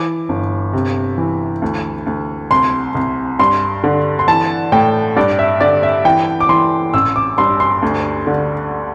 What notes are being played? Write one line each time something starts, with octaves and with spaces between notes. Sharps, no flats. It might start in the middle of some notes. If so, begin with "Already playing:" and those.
Already playing: E3 D6
G1
C3
E3
D2
D2
C2 C6
C2
G2 C6
D3
C6
E3 A5
A2 G5
G2 D5
E5
D3 D5
E5
E3 G5
D6
E3 C6
A1 E6
D6
G2 C6
C6
D2
D3